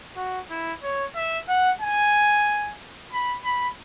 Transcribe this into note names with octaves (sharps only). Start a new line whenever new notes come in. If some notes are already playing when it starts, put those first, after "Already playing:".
F#4
E4
C#5
E5
F#5
G#5
B5
B5